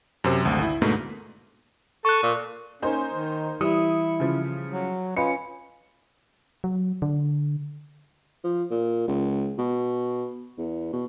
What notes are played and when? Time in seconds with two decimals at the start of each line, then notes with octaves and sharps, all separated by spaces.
0.24 F#2 C3 C4
0.45 G#1 D2
0.63 E4
0.82 G#2 B2 D3 A3 A#3
2.05 A4 C#6 F#6
2.23 A#2
2.82 A#3 C#4 D#4 C5
3.13 D#3
3.61 E3 G3 E4 D#6 C#7
4.20 C#3 F3
4.71 F#3
5.17 C#4 F4 B4 D#5 C#7
6.64 F#3
7.02 D3
8.44 F3
8.70 A#2
9.07 C#2
9.58 B2
10.57 E2
10.93 B2